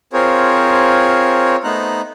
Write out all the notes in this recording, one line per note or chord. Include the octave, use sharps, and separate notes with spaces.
C4 F4 G#4 A#4 C5 C#5
A3 B3 D#4 C5 A#5 F#6